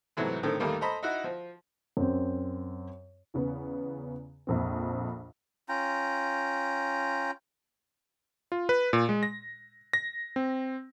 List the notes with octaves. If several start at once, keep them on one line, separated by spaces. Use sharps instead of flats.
G#2 C3 E3 F#3 A3
A2 D3 D#3 C4
D#2 D#3 G3 A3 A#3
A4 C5 D#5 A#5 B5
D#4 E4 F#4
F3
F#2 C4
E2 C#3 B3
A#1 F2 C4
C#4 F4 G5 A#5
F4
B4
A#2
G#3
A#6
A#6
C4